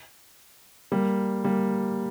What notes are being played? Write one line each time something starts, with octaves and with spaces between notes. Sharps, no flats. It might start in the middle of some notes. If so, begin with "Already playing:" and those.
G3 A#3
G3 A#3